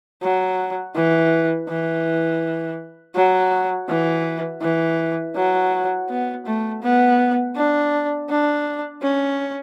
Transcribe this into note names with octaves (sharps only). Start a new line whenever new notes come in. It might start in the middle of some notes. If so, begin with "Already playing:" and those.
F#3
E3
E3
F#3
E3
E3
F#3
B3
A3
B3
D4
D4
C#4